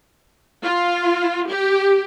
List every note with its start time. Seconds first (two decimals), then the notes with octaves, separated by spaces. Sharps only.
0.64 F4
1.49 G4